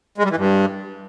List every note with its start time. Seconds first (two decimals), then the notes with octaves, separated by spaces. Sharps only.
0.18 G#3
0.24 G3
0.30 E3
0.36 G2